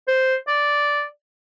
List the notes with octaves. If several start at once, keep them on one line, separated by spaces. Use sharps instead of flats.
C5
D5